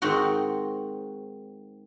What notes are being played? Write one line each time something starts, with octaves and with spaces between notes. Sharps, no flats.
G#2 D#3 C4 D#4 F#4